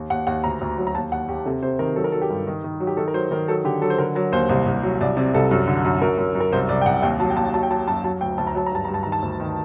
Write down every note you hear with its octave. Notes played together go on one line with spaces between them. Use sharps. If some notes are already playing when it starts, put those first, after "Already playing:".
Already playing: D#2
D#2 F#5
D#2 F#5
D2 A#5
D2
F#3
A#5
D#2 A5
D#2 F#5
D#2 G4
C3 A4
C3 C5
D#3 A#4
F#3 A4
A#4
F#3 A4
G4
G2
D#3
D#3
F#3
G4
D#3 A4
A#4
F#3 C5
D#3 A#4
F#3 A4
D3 G4
F#3 A4
C5
D3 A#4
F#3 A#4
D#2 C5
C2 C5
C2
F#3
C2 D5
C3 D5
C2 A4
F#2
D3
F#2
F#2 A#4
F#2
F#2
A#4
C2 C5
C2 D5
G5
C2 F#5
D#2 G5
F#3 A5
G5
D#2 A5
F#3 A5
G5
F#3 A5
F#2 A5
F#3 A5
D2 G5
D2 A5
A#5
F#3 A5
A#5
G2 A5
G2 A#5
A5
D#3 A#5
A5
D2
D#3